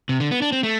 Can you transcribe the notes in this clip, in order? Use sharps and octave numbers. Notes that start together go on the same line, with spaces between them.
C3
D3
B3
D4
C4
A3